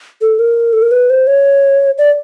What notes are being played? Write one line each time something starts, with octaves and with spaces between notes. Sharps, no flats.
A4
A#4
A4
A#4
B4
C5
C#5
D5